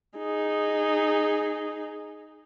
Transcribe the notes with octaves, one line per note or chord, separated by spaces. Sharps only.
D#4 G#4